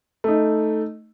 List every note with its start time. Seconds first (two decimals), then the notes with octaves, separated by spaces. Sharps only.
0.24 A3 D#4